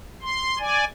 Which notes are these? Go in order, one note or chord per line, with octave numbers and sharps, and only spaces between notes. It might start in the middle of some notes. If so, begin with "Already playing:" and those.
C6
D5 G#5